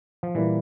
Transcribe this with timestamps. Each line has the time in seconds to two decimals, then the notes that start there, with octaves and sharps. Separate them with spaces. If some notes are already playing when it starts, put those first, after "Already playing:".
0.23 F3
0.35 A#2 E3 G3 A#3 E4